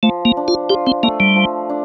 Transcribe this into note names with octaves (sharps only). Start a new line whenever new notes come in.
F3 A3
A#3
D4
F4
F4 G4
C4
A3 A#3
G3
F3
D4